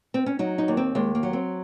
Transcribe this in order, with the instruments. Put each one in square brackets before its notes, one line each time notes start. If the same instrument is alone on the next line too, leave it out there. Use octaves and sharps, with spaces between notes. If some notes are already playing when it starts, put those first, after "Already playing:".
[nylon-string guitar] C4
C#4
F#3 D#4
D#4
D#2
C4
D#2 G#3
A#3
F#3
C4